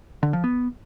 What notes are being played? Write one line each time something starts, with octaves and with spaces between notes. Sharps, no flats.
D3
F3
B3